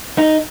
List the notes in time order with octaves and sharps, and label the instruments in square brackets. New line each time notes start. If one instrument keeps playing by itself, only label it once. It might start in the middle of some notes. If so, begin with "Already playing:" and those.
[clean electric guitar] D#4